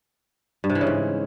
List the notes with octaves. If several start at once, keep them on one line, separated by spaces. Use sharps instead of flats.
G2
C3
E3
C#3
G#2